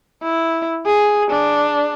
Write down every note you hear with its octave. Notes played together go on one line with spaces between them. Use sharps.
E4
G#4
D4